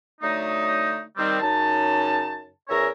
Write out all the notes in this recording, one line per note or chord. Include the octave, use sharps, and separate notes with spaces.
D3 F#3 A3 D#4
D#3 G3 C4
F#2 C#3 D#4 A5
E2 C#4 A#4 C#5 E5 A#5